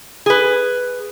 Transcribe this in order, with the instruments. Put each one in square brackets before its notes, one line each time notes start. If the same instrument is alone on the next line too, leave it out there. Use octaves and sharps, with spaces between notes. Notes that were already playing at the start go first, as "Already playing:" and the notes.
[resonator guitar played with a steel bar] G#4 B4